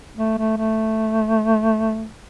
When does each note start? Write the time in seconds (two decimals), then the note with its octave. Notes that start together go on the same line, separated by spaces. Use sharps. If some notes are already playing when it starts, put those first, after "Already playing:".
0.16 A3
0.38 A3
0.57 A3